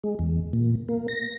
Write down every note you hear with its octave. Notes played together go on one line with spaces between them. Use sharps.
G#3
E2
A#2
A#3
A#6